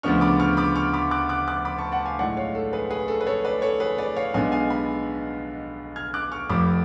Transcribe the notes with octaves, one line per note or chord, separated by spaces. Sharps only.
D2 C#3 F3 B3 D4 C#6 F6
B5 D6
C#6 F6
B5 D6
C#6 F6
B5 D6
D6 F#6
D6 F#6
D6 F#6
B5 D6
A5 C#6
F#5 A5
F5 G#5
B1 A2 G#3 D5 F#5
C#5 F5
A4
G#4 B4
G#4 B4
A4
B4
A4 C#5
B4 D5
A4 C#5
G#4 B4
B4 D5
C#5 F5
B1 B2 G#3 B3 D4 F5 G#5
F5 G#5
G#5 B5
F6 G#6
D6 F#6
C#6 F6
F1 F2 F3 B5 D6